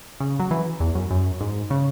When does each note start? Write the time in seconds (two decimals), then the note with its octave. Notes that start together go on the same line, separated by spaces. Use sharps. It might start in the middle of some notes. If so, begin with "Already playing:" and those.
0.20 C#3
0.40 F#3
0.51 E3
0.80 E2
0.95 F#2
1.11 F#2
1.41 G#2
1.70 C#3